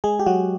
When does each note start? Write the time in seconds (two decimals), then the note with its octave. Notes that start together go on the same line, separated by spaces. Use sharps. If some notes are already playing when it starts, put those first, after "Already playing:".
0.04 G#3 G#4
0.19 G4
0.26 F#3 F#4